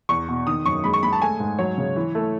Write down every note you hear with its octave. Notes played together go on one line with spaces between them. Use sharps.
E2 C#6
B2
D#3 D#6
F#2 C#6
G#3 B5
C#6
G#3 B5
A5
A3 G#5
G#2
F#3 C#5
C#3
E3
A3